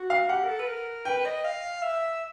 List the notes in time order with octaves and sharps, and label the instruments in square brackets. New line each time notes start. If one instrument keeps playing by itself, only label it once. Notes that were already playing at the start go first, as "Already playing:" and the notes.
Already playing: [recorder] F#4
[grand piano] F5
[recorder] G4 [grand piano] F#5
[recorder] A#4
A4
B4
A#4
[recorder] B4 [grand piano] G5
[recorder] D#5
F5
E5